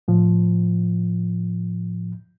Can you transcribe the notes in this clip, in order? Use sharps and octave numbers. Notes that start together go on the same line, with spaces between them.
A2 F3